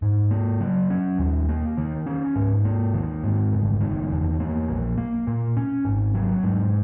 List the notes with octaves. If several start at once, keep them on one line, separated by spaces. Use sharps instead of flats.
G#2
A#3
F#3
C#4
D#2
A#3
D#3
C#4
G#2
A#3
D#3
G#2
F#1
D#3
E2
A#3
A#1
A#3
A#2
C#4
G#1
F#3
G#2